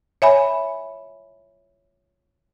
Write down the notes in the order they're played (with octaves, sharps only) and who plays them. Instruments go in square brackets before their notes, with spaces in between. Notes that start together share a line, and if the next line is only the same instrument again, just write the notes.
[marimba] C#5 E5 G#5 B5